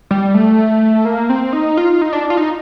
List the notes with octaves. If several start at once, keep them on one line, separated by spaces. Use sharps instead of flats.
G3
A3
A#3
C4
D#4
F4
D#4
D4
F4
D#4